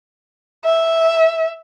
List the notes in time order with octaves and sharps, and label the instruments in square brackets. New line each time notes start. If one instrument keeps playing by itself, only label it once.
[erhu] E5